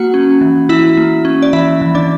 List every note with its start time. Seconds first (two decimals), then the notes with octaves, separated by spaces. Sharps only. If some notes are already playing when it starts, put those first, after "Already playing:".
Already playing: A#3 F#4 F#5
0.14 C#4
0.41 E3
0.69 E3 E4 E5
0.97 A#3
1.25 C#4
1.42 D5
1.53 E3 E4 E5
1.82 E3
1.95 D4 D5